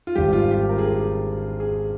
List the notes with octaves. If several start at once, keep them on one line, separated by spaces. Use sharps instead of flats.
F4
G#1 G#2 G3 G4
F4
G4
A#4
G#4
G4
G#4
G#4